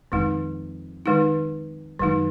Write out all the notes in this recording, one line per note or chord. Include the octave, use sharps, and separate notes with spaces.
F2 D#3 G#3 D#4
D#3 G#3 D#4
F#2 D#3 G#3 D#4